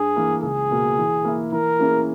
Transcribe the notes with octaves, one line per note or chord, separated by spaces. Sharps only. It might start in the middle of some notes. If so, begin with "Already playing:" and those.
Already playing: G2 G#4
E3 A#3
C#2 G#4
B2 A#3
E3
A#3 E4
E3 A#4
A#3 C#4 E4 G#4